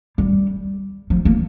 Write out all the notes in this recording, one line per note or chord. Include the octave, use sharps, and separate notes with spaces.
G3
F3
A#3